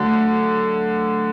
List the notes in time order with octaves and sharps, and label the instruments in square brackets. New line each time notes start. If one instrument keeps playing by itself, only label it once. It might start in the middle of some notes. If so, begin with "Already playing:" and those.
Already playing: [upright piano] D3 [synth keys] F#3 A3